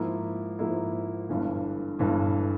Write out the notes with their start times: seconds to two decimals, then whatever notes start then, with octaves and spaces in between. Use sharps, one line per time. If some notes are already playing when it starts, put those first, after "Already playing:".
Already playing: G#2 F3 A#3 E4
0.59 G#2 F3 A#3 E4
1.29 G1 G2 E3
1.99 G1 G2 E3